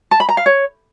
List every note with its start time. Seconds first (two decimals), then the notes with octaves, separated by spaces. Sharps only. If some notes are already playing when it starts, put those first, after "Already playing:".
0.11 A5
0.20 B5
0.29 A#5
0.37 F5
0.46 C#5